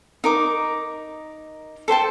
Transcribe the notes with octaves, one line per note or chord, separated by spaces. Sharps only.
D#4 A#4 D6
A4 C5 G5 A5